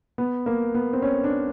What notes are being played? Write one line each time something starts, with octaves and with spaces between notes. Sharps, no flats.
B3
A#3
B3
C4
C#4
D4